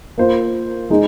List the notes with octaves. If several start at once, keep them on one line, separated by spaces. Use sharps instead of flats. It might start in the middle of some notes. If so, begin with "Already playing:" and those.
A#3 F4 C5
G#3 D#4 G#4